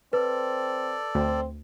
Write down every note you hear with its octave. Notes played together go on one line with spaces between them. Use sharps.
C4 A4 B4 D5
D2 C4